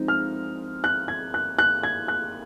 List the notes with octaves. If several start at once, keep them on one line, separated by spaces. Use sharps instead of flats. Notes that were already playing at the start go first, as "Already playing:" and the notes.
Already playing: F3 G#3 C4 D#4
F6
F#6
G#6
F#6
F#6
G#6
F#6